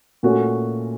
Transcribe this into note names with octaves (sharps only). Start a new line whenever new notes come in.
A#2 A3 C#4 F#4